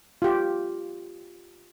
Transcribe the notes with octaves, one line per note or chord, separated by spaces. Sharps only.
F4 G4